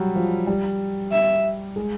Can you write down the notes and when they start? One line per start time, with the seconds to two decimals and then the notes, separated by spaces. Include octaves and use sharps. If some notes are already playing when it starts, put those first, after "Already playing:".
Already playing: F#3 G3
0.16 F3
0.47 G3
1.12 E5
1.76 G#3